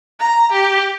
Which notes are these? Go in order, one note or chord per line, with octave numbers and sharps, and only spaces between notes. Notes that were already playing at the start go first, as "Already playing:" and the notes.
A#5
G4